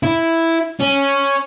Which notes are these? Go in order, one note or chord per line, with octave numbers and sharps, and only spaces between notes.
E4
C#4